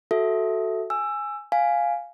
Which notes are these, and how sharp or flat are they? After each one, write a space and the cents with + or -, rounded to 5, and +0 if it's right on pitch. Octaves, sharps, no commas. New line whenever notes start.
F#4 +0 A4 +0 E5 +0
G#5 +0 E6 +15
F5 +0 G#5 +0